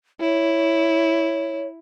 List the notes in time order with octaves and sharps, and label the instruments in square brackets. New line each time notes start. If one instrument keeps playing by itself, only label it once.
[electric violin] E4 [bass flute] C#5